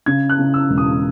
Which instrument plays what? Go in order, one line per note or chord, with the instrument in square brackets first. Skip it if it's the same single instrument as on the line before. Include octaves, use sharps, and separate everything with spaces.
[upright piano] C#3 G#6
F#6
C#3
E6
E1
D#6